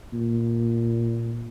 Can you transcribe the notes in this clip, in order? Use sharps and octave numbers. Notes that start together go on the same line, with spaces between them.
A#2